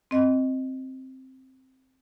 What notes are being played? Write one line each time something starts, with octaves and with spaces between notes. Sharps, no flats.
C4 D#5